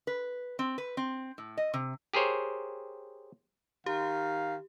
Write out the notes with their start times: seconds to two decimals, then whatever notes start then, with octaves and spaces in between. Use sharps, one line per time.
0.07 B4
0.59 C4
0.78 B4
0.97 C4
1.38 A2
1.57 D#5
1.74 C3
2.14 G4 G#4 A#4 C5 C#5
3.86 D#3 G4 F5